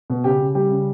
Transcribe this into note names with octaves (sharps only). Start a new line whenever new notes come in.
B2
C#3 G4
C#3
G3 G4
C#3